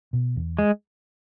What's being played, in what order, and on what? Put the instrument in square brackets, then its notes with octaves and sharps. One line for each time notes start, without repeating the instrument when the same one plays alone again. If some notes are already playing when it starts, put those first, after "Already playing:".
[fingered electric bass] B2
E2
[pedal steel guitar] G#3